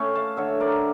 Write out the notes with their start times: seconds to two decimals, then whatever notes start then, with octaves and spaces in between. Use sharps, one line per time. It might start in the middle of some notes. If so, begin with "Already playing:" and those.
Already playing: A3 C#4 G5 C#6
0.15 F5 A5
0.37 D3 C#5 E5
0.60 A#4 D5